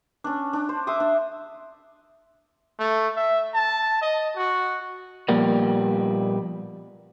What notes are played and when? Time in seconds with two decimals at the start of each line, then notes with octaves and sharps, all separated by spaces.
0.24 C#4 D4
0.53 D4
0.69 C5
0.87 E5 C6 D6 D#6
1.00 D4
2.79 A3
3.16 E5
3.54 A5
4.02 D#5
4.37 F#4
5.29 A#2 F3 G3 A#3 B3